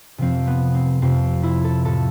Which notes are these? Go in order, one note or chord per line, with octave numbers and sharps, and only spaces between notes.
F2 C3 F3 C4
B3
C4
F2 C3 F3 C4
E4
A4
A2 F3 A4